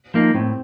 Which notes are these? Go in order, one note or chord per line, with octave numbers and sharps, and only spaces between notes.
F3 A#3 D#4
A2 C4